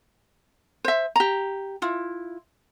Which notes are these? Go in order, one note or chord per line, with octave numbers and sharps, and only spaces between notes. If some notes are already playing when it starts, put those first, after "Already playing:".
C5 E5
G4 A#5
E4 F4